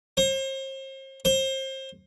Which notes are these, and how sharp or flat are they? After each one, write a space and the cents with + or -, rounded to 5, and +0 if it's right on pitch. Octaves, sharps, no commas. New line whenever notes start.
C5 +40
C5 +30